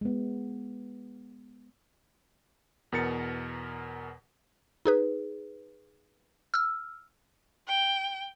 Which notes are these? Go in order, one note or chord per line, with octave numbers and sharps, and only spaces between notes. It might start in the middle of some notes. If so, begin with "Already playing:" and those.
G#3 B3
E2 B2 A#4 A6 C#7
D#4 G#4 B4
E6 F6
G5